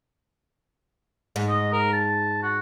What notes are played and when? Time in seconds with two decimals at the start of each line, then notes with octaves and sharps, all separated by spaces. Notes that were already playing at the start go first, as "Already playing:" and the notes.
1.36 G#2
1.49 D#5
1.73 A#4
1.93 A5
2.43 F#4